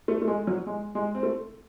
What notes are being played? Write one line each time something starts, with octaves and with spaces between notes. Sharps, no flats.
A3
A3
G#3
F#3
G#3
G#3
C4
A3